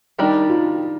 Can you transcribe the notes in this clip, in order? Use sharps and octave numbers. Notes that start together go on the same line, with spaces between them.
D#3 G3 D4 D#4 G4 A#4
F4